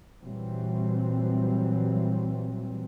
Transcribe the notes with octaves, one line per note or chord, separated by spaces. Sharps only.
A#2 E3 F#3 G3 C4